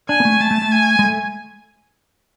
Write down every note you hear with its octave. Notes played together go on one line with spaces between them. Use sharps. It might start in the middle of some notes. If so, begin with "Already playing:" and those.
D4 G#5
B3
A3
A3 A5
A3
A3
G#5
G#3
A3